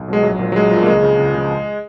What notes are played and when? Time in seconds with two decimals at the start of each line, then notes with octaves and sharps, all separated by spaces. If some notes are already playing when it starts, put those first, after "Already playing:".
Already playing: B1
0.08 B2 F#3 G#3
0.23 A#1 F#3
0.39 A#2 F3
0.52 F#3
0.56 A#1 G#3
0.71 A#2 F3
0.83 A#3
0.87 C#2 G#3
1.02 C#3 F3
1.19 C#2
1.35 C#3 F3